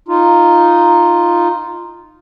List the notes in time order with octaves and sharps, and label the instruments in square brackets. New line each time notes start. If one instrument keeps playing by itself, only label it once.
[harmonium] D#4 F4